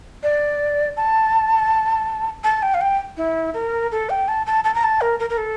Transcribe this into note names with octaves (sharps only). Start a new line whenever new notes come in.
D5
A5
A5
G5
F5
G5
E4
A#4
A4
G5
A5
A5
A5
A#5
A5
A#4
A#4
A#4
A4